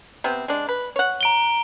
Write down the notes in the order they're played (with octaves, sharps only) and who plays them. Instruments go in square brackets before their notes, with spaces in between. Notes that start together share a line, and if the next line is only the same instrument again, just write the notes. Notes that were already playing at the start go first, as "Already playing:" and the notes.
[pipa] C3 B3 C4
G#3 D4
B4
C#5 F#5
[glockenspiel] A#5 D7 G7